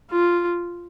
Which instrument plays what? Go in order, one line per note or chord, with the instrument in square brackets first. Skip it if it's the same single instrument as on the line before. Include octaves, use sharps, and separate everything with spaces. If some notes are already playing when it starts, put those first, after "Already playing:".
[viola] F4